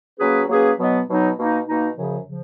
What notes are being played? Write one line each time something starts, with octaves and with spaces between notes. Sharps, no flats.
F#3 A#3 C#4 G#4 B4
F#3 A#3 C#4 G#4 B4
B2 F#3 B3 D#4
B2 F#3 B3 D#4
B2 A#3 D#4
B2 A#3 D#4
F#2 C#3 F3
C#3 F3